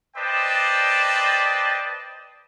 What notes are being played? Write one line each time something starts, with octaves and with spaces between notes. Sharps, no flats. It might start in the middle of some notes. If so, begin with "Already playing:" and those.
B4 C5 D5 D#5 G5 A5